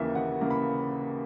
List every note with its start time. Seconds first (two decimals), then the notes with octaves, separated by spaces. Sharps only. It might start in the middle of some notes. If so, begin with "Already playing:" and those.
Already playing: D#2 C#3 E3 A#3 E5
0.15 D#2 F#5
0.41 C#3 E3 A#3
0.50 B5